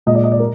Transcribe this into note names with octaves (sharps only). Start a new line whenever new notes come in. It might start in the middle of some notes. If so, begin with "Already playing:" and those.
A#2 G#3 D#5
D5
D#5
D5
A#4